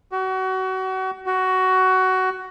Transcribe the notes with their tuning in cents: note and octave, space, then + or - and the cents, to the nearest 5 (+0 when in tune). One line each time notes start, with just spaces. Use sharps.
F#4 +30
F#4 +15